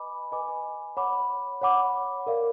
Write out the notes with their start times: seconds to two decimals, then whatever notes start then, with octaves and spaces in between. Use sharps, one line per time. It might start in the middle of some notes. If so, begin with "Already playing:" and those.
Already playing: B4 D#5 G#5 B5 D6
0.32 B4 D#5 G#5 B5 D6
0.97 C#5 F#5 B5 D6
1.61 C#5 F#5 B5 D6
2.27 A#4 D5 F5